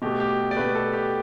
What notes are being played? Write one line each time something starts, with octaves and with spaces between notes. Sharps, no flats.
B2 A3 G4
G4
D5
B2 A3 B4
A4
G4